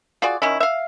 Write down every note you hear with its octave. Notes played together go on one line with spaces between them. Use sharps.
F4 F#4 G#4 D5
D#3 C#4 E4
E5 F5